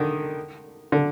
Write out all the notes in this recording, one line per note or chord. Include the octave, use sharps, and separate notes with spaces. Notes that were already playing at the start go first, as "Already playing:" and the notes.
Already playing: D3 D#3
D3